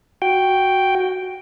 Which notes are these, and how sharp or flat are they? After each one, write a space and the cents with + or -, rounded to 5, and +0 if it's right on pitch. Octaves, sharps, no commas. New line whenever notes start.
F#4 +0 G5 +0